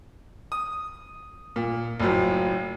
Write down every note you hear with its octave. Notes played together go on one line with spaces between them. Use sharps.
D#6
A#2
F#1 A2 F3 F#3